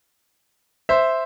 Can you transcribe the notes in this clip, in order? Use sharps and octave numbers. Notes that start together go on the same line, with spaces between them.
C5 E5